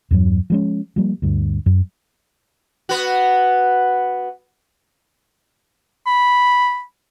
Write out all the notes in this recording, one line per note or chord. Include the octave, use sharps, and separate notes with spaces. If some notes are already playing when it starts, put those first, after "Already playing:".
E2 G2 F#3
F3 G#3 C#4
F3 G3 A#3
D2 G2
F#2
B3 F#4
B5